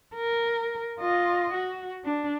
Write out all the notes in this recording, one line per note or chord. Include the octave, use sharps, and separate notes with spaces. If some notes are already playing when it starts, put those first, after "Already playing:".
A#4
F4 D#5
F#4
D4